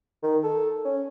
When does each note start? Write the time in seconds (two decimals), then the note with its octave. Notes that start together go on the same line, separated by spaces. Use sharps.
0.23 D#3
0.44 A4
0.85 C#4